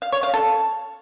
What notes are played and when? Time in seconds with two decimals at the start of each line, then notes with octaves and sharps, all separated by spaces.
0.02 F5
0.12 C#5
0.23 F5
0.34 A4